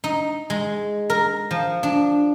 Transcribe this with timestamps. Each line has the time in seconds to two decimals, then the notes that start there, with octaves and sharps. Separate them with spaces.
0.04 D#4
0.50 G#3
1.10 A#4
1.51 F3
1.83 D4